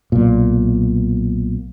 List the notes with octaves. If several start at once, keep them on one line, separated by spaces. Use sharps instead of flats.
B1 A#2